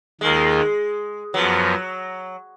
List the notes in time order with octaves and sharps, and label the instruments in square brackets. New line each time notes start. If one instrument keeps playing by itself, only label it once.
[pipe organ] D#2 D#3 A#3 F4 [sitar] G#3
[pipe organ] F#2 F3 B3 [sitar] F#3